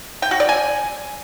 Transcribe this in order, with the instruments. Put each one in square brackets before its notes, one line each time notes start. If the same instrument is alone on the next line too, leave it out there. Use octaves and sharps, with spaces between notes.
[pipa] G5
F#4
D5
G#5